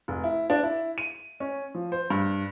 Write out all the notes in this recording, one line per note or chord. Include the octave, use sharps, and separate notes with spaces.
F1
E4
D4
E4
D#7
C#4
F3
C5
G2